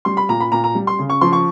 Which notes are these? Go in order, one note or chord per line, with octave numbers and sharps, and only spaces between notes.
G3 C6
B5
A#2 A#5
B5
A#2 A#5
A#5
G3
C6
C#3
C#6
F3 C6
C#6